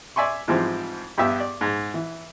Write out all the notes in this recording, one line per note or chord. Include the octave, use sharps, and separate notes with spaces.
D5 E5 G#5 C6 C#6
G#2 E3 F3 G3 C4
G2 B3 G4 E5
D5
G#2
E3